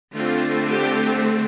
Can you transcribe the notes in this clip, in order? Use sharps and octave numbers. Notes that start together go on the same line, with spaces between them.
D3 A3 C4 F4
G4